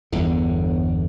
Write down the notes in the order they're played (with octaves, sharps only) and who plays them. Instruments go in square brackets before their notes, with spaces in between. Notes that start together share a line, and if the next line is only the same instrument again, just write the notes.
[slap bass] G1 E2 D3